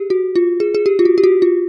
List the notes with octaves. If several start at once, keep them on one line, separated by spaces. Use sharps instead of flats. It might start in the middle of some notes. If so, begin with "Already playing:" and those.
Already playing: G4 G#4
F#4
F4
G#4
G#4
G4
F4
F#4
G4
F#4
F4